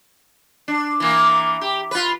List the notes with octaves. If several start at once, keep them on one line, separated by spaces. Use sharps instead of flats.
D4
E3 A#3
G4
F4 B4